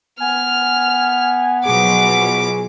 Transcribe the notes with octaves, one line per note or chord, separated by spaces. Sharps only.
B3 G#5 F6
B2 F3 F#3 G#4 D6